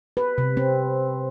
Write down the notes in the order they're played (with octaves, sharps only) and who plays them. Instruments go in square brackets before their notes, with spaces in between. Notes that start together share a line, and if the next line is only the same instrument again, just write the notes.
[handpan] B4
C3
C4